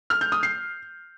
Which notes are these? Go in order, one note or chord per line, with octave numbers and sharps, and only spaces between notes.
F6
G6
D#6
C7